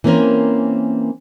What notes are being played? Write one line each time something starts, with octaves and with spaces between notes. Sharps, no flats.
E3 A#3 C4 C#4 A#4 C5